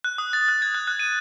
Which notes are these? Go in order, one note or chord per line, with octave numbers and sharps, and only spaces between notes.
F#6
D#6
A6
F#6
G#6
F#6
F#6
D#7